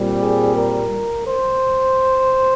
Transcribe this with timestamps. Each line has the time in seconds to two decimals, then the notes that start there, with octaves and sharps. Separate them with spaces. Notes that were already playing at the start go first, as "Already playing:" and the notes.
Already playing: A#2 G3 C4
0.21 G#4
0.56 A#4
1.27 C5